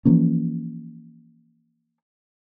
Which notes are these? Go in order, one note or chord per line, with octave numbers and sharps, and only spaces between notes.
E3 F3 A#3 C#4